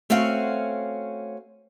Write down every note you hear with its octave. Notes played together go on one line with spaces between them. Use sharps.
A3 C4 C#4 F#4 F5